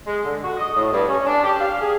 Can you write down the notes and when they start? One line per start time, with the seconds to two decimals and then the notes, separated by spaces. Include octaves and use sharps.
0.07 G#3
0.24 D3
0.43 F#4
0.57 D#5
0.76 A2
0.92 G2
1.08 C#4
1.26 D4
1.44 G4
1.60 F5
1.81 G#4